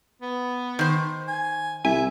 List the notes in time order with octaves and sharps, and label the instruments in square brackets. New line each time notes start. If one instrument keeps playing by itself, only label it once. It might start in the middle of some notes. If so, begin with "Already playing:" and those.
[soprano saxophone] B3
[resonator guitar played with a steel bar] D#3 C5
[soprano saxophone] G#5
[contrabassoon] C2 [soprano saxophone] E5 [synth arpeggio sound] G#5